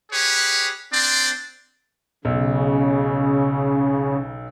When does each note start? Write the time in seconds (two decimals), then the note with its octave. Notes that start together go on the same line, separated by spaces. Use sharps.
0.12 G4 G#4 B4 C#5
0.93 C4 D4 C5 D5
2.25 B1 C#3